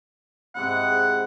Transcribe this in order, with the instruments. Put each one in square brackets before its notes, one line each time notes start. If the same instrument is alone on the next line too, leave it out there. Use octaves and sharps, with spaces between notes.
[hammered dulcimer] G#2 C3 E4 [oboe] F#5